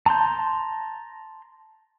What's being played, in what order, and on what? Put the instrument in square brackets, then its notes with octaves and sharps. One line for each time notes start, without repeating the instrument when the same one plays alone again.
[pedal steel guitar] A5 A#5 C6 G6